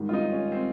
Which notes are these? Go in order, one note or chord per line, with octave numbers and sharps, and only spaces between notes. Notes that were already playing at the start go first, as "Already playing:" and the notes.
Already playing: G#2 D#3 G3
F4
D#4
C#4
C4